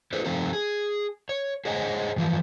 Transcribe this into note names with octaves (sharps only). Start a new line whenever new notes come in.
E4 G#4 A4 B4 C5
G2 C3 F3 C4 D#4 A4
G#4
C#5
G#4 C5 C#5 D#5 F#5 G#5
G2 E3 F3